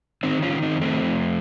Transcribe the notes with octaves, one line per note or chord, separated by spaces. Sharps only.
D#3 C4 D#4
C#4 F4
D#3
C4 D#4
F2
A3 C4
F2